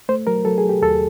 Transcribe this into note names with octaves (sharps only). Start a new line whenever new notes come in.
A3 C5
F#3 A#4
F#3 A4
G#4
F#3
G4
D#2 A4